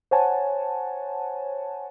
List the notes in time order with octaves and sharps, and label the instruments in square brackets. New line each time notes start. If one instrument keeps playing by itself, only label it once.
[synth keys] C5 C#5 F#5 G#5 A5